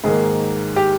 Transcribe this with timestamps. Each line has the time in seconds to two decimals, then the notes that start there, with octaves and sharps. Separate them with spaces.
0.04 G#2 D#3 A#3 G#4
0.76 G4